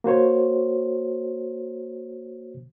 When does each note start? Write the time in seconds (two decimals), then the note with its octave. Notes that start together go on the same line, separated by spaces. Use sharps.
0.04 A#3 F#4 C5 C#5